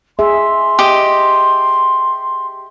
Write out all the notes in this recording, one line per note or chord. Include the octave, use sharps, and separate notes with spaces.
G#4 E5 C6
G4 D#5